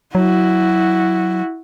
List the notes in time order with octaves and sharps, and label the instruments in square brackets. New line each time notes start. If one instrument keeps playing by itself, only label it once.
[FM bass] F#3 [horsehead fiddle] E4 F#4